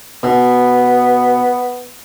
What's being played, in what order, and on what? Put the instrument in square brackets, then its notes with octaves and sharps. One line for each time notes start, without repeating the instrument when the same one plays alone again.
[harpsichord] B2 [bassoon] B3